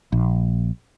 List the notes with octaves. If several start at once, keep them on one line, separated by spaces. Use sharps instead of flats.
A#1